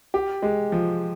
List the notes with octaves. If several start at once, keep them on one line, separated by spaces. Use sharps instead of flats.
G4
G#3
F3